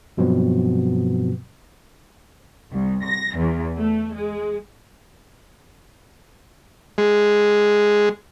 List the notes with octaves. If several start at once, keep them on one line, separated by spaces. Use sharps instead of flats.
G2 B2 F3 F#3 B3 C4
C2
A#6
E2
A3
G#3
G#3